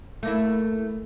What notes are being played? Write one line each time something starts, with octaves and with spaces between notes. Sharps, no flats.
A3 A#3 E4